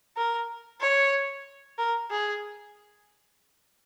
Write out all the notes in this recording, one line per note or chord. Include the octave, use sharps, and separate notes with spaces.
A#4
C#5
A#4
G#4